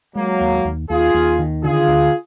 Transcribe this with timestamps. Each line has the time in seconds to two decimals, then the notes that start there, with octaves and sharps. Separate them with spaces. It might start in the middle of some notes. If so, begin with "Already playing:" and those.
0.15 F#3 G#3 A#3
0.40 D#2
0.65 D#2
0.90 D#2 F4 G#4
1.14 D#2
1.39 D#3
1.64 D3 F4 G#4
1.88 D2